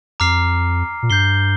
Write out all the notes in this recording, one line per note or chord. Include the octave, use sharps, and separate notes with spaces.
F2 A#5 D6 F6 C7
A#2
G2 G6 C7 G7